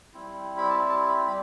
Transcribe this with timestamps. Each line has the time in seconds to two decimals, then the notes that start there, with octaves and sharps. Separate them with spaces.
0.14 G3 C4 E4
0.58 B5
0.70 A5
0.89 A5
1.08 B5
1.27 G3 B5